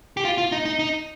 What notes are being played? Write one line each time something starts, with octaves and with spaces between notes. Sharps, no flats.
G4
F4
F4
D#4
D#4
D#4